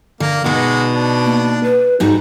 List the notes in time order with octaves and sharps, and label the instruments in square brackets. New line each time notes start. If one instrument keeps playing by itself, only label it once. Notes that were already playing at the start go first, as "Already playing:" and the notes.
[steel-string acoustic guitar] D3 [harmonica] A#3
[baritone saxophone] B2 [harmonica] G#3 F#4 [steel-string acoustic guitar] D#4 D5
[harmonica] D4
[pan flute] A#3
B4
[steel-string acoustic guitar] G#2 G3 F#4 [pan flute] D#4